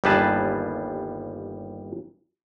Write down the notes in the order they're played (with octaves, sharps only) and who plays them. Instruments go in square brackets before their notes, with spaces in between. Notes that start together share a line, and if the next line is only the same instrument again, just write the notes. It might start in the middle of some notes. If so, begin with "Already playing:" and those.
[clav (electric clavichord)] G1 D#2 G3 G#4 B4 A5